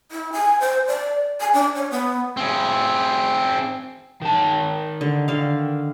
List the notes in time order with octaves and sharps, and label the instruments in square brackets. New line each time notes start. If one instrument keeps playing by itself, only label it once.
[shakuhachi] E4
G#5
C5
D5
G#5
D4
C#5
B3
[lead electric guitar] C4 G#4
[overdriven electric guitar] D#3 A5
[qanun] D3
D3 F5